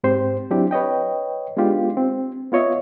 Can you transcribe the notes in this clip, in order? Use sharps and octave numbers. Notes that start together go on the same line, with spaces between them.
G#2 C4 G4 C5
F#3 C4 D4 E4 G4
B4 C#5 D#5 G5
G#3 B3 D4 D#4 F4 G4
C4
B3 F4 C#5 D#5 E5